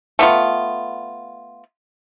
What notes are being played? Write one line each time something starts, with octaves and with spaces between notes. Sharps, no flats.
A3 B3 F4